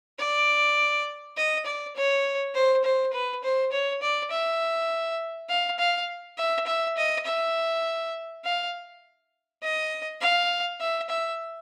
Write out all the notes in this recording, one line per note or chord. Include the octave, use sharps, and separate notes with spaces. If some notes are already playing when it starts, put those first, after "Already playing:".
D5
D#5
D5
C#5
C5
C5
B4
C5
C#5
D5
E5
F5
F5
E5
E5
D#5
E5
F5
D#5
F5
E5
E5